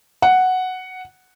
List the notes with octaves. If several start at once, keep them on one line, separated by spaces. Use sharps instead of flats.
F#5